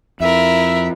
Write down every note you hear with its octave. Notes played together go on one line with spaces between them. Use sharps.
F2 E4 A#4 E5